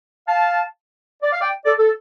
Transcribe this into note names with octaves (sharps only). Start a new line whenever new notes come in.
F5 A5
D5
F5
D5 G5
A4 D5
A4